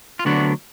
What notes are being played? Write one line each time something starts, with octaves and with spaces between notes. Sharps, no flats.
F4
D2 D3 F#3 B3 D4 F#4